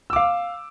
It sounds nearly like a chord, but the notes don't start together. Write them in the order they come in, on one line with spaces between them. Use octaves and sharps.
E6 D6 F5